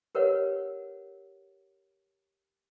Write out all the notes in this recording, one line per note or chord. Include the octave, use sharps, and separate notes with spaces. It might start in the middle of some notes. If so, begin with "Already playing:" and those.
G4 A#4 B4 C#5 F#5